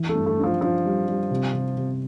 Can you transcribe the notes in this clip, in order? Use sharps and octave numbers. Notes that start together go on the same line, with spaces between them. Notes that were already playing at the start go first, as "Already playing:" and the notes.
Already playing: E3
A3
G2
A3
D4
F3
F3 D4
G3
G3
C3
C3
C3